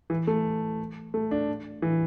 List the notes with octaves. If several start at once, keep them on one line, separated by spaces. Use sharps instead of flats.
E3
A3
A3
D4
E3